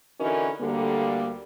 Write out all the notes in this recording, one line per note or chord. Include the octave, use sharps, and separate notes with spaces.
D3 E3 C#4 D#4 F#4 A#4
D2 D3 G3 A#3